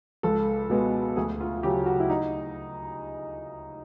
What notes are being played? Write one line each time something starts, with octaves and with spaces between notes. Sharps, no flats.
C#2 A4
B2 G#3 B3
D2 G#4
F4
C#3 F#3 G4
F#4
E4
D#4